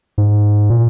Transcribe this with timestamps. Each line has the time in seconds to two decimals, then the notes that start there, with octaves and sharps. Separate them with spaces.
0.18 G#2
0.70 A#2